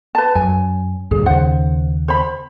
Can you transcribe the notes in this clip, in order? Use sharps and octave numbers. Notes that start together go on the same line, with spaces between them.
B4 A5
F#2 G#5
D2 G2 A#2 G#4
D#2 C#3 C5 F#5
C5 B5